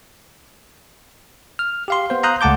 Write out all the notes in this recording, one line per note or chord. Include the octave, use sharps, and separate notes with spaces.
F6
G4 F5 C6
B3 C5
F5 A#5 C6 D#6 F#6 G6
C#2 A3 F#5 A5 D6 G6